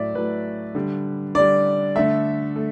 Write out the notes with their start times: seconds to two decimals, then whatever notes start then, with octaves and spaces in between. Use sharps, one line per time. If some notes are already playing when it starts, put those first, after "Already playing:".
Already playing: A2 F#3 A3 D5 E5
0.14 A2 F#3 A3 B4
0.75 D3 G3
1.35 D3 G3 D5
1.96 D3 A3 E5
2.56 A3